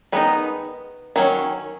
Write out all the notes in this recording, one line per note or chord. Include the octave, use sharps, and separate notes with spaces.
D#3 G#3 B3 D#4 B4
D#3 F#3 C#4